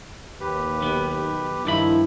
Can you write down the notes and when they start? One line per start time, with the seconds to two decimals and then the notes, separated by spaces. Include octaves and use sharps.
0.41 D#2 G4 B4
0.82 B1 D#3 B3
1.65 G2 D#3 F3 E4 D5 B5